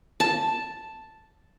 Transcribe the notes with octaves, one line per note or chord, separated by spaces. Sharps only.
A5